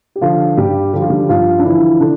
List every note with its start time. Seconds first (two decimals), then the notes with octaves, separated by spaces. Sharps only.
0.16 G4
0.21 D3 F3 F4
0.57 G2 G3 G4
0.93 D3 F3 G4
1.02 F4
1.09 G3 G4
1.29 G2 F3 F4
1.59 D4
1.64 D3 E3 F3 E4
2.00 D3 D4